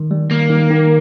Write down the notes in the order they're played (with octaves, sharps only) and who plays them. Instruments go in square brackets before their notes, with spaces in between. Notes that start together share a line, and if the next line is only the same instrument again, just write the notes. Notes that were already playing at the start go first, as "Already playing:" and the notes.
Already playing: [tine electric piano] D#3
G3
[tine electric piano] D#3 [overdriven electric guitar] A#3
[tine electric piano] D#3
D#3